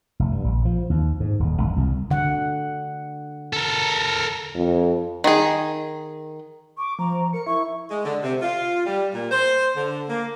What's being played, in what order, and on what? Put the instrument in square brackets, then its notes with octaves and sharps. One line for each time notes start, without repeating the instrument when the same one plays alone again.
[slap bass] F1
G2
A#1
F3
D#2
G#2
D#1
G1
C2
[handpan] D3 F#5
[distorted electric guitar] A4 A#4
[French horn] F2
[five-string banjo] D#3 G#4
[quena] C#6 [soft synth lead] D6
[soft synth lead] F3 [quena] A#5
[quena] A#4 [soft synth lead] C#7
[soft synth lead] E4 [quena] C#6
[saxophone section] G#3
D3
C3
F4
G3
A#2
C5
D3
A#3